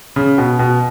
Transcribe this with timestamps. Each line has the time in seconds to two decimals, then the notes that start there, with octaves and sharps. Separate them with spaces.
0.16 C#3
0.38 B2
0.59 B2